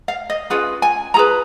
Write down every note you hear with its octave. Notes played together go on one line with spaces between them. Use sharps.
F5
D#5
C#4 F4 G#4 B4 F5
G#5
F4 G#4 B4 A#5